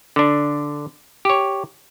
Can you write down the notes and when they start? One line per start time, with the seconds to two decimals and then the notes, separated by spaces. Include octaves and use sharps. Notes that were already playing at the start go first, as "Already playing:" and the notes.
0.16 D3 D4
1.25 G4 C#5